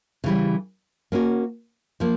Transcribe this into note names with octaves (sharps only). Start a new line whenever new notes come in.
C#3 E3 G3
A#3 C#4 F#4
F3 A#3